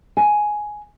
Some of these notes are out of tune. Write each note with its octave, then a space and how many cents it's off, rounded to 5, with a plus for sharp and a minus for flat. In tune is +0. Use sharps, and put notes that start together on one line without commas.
G#5 +10